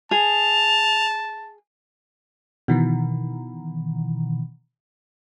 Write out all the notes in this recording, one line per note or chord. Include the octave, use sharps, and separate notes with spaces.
G#4 A5 F7
B2 D#3 E3